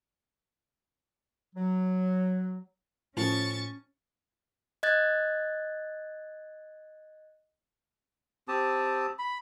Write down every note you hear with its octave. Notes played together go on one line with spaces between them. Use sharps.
F#3
A2 F3 C#4 C#6 A6
D#5 F#6 G#6 A6
C4 G4 A5 D#6
B5